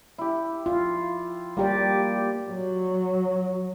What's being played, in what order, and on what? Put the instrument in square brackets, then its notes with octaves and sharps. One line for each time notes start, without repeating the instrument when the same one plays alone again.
[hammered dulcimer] E4 G4
[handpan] F4
[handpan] G3 G4 D5 [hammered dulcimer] A#3
[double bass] F#3